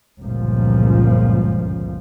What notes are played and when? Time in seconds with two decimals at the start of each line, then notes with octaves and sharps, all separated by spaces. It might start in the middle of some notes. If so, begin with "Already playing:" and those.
0.20 G1 C#2 F#2 A#2 F3